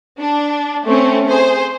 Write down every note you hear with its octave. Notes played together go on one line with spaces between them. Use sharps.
D4
A3 C4 C#4
G#4 C5